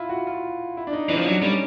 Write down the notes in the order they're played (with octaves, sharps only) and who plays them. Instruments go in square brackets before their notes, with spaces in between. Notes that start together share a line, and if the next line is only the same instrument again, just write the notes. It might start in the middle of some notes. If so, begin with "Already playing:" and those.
Already playing: [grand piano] E4 F4
F#4
F4
E4
D4
D#4
[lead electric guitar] E3 [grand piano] C#4
[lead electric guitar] F3
[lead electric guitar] F#3 [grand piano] D4
[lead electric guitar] G3 [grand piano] C#4